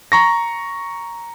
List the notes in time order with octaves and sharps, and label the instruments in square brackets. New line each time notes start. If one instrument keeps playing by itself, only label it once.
[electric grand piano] A#5 C#6 A#6